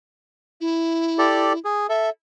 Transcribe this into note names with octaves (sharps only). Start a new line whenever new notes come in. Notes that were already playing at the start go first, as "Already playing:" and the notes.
E4
G4 A4 D5
G#4
A4 E5